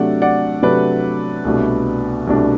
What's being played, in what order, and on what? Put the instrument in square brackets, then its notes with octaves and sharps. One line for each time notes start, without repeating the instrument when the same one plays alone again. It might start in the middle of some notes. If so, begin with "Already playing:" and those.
Already playing: [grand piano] C3 F#3 A3 D4 D5 F#5
D5 F#5
C3 F#3 A3 D4 B4 D5
C2 B2 A3 D4
C2 B2 A3 D4